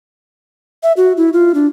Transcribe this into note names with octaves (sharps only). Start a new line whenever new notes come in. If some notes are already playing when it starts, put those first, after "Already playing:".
E5
F#4
E4
F4
D4